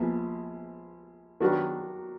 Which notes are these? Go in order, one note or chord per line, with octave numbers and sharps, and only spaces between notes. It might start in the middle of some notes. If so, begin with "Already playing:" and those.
Already playing: A#1 A#2 G#3 B3
D#3 F#3 D4 F#4 B4